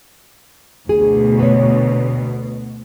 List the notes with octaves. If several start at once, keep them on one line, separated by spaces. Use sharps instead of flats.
D2 B2 G#4
B3 C#5